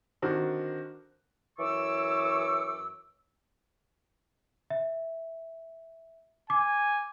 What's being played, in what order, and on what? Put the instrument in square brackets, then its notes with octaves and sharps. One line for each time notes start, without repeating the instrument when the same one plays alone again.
[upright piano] D3 D#3 C4 D4 F#4 A#4
[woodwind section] F#2 E3 C#5 C#6 D6 E6
[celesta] E5
[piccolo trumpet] G#5 [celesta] D6